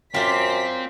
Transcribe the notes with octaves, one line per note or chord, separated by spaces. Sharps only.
F#2 C4 F4 D5 B6